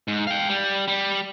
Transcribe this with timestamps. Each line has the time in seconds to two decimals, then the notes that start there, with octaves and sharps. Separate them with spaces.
0.08 G#2
0.27 F5 G5
0.49 G3
0.88 G3